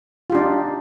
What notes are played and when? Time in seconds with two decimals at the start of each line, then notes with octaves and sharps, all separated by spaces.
0.30 F4
0.32 G4
0.35 D4
0.37 D#4